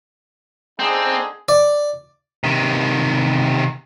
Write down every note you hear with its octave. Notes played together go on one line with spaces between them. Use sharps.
D3 C4 D#4 G#4
D5
C3 D#3